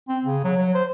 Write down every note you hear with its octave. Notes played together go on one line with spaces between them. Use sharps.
C4
C#3
F#3
F#3
C5